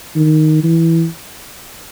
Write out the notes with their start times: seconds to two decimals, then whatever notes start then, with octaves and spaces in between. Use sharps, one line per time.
0.16 D#3
0.63 E3